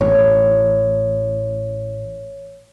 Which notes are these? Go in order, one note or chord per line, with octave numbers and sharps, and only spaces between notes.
A1 C#5